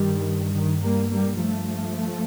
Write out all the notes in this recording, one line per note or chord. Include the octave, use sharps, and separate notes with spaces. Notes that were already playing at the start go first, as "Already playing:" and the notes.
Already playing: G2 D#3 G3
D#3
G3 A#3
G3 A#3
F3 A3